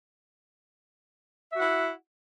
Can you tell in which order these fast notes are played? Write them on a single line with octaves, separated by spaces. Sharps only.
E5 F#4 F#5 E4